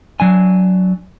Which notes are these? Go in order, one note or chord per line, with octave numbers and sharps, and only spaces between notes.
F#3 D4 G#5